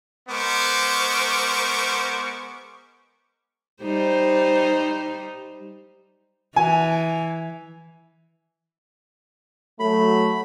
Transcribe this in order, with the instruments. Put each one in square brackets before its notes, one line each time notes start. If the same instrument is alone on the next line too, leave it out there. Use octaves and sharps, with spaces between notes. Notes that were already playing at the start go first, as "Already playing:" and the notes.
[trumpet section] G#3 B3 A#4 C5 C#6 D6
[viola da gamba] G3 D#4 C5
[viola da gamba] E3 [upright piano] G#5
[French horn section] F#3 A3 [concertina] B5